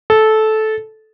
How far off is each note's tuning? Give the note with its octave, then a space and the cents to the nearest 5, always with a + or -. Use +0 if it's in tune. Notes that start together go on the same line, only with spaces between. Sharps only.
A4 -15